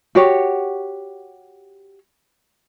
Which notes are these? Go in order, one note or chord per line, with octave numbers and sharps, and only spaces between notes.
F#4 G4 C#5